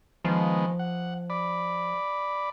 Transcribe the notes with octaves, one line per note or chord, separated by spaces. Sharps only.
D#3 F3 G#3 B3
F#5
D5 B5